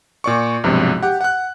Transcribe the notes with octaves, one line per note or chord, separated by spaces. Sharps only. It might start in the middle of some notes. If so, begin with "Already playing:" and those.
A#2 D5 C#6
B1 G2 C3 F3 G#3
G4 F#5
F#5 F#6